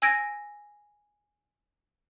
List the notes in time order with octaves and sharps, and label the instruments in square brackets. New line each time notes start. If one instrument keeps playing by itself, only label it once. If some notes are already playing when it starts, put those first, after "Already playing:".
[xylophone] G#5 E6 G#6 A#6 D7